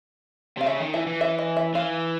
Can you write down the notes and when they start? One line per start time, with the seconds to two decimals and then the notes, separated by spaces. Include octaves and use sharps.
0.58 C3 F5
0.66 C#3 E5
0.80 D#3
0.94 E3 E5
1.07 E3
1.21 E5
1.38 D#5
1.57 E5
1.74 E3 F5